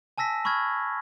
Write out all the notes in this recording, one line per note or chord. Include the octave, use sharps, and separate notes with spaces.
G#5 A5 E6 A#6 B6
B5 C#6 E6 F6 G#6